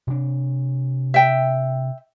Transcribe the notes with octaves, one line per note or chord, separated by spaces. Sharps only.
C3 D4
E5 G5